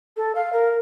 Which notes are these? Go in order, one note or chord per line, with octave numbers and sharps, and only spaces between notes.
A4
F5
A#4